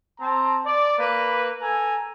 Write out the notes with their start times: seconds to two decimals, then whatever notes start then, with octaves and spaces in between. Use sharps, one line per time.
0.20 C4 A5 A#5
0.65 D5
0.99 A#3 B4
1.61 A4 G#5 A#5